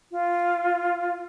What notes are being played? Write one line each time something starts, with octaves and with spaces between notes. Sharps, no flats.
F4